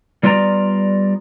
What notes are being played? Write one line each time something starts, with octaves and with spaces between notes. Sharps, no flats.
G3 B3 F4 D5 E5 A#5